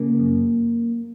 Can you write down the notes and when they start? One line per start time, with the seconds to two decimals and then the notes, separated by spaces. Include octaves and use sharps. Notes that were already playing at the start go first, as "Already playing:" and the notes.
Already playing: C#3 A#3
0.19 F#2